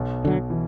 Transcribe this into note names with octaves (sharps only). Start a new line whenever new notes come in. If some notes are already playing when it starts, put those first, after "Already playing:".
Already playing: B1 B2
D3 F#3
E3